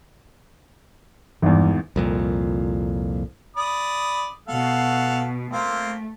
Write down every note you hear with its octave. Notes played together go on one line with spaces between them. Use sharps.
G#1 E2 G2 E3
C2 F2 A#2
D5 B5 D#6
B2 A4 F5 F#5
A3 A#3 C4 F4